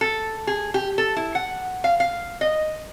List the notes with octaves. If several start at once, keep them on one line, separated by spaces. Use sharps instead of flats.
A4
G#4
G4
A4
E4
F#5
F5
F5
D#5